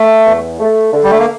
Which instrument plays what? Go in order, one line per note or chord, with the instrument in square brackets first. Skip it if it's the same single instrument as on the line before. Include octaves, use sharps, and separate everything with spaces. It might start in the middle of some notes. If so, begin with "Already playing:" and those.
Already playing: [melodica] A3
[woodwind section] E2
A3
D3
[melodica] G3
A3
A#3